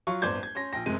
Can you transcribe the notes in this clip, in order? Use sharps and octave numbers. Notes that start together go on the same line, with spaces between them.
F#3 F4 C#6
D1 G1 C5 D5 G6 G#6
G#6
C#4 C6 A#6
A#1 G5 A#6
F#1 C3 G#3 D#7